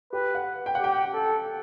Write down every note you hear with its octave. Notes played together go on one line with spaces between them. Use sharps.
G4 B4
F#5
G5
F#5
G4 G5
A4